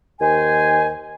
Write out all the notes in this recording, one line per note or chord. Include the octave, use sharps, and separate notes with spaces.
D#2 D#3 C5 G#5